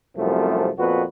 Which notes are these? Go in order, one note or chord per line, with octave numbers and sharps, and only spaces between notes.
C2 F#2 C3 F3 A3
F2 A#2 B3 F#4 B4